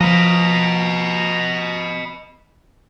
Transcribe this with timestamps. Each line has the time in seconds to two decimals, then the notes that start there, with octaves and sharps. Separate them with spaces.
0.01 F3 B4 D#5 A#5